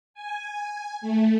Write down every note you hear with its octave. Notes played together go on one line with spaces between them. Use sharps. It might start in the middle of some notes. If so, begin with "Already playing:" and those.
G#5
A3